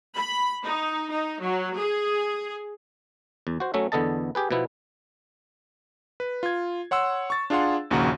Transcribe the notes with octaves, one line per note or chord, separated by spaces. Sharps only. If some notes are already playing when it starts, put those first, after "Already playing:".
B5
D#4
D#4
F#3
G#4
E2
F#4 C5
F#3 A3 C#4 E5
E2 D3 B3 A4 D#5 A5
G4 G#4 B4
B2 F3 B3 E4
B4
F4 G#6
C#5 F#5 C6 E6
C#6 A6
D4 F4 G#4 F5 F#5 C6
A#1 D#2 C#3 F#4 F#5 A#5